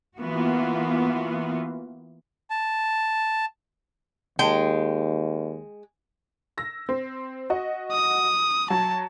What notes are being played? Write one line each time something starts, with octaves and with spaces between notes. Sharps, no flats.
E3 A#3 B3 F4 F#4
A5
D#2 G#3 G5
E6 A#6
C4
F#4 D#5
D#6
F#3 A5